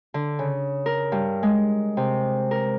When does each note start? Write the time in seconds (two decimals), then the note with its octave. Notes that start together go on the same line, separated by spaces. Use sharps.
0.14 D3
0.39 C#3
0.86 A#4
1.12 G2
1.43 G#3
1.97 C3
2.51 A#4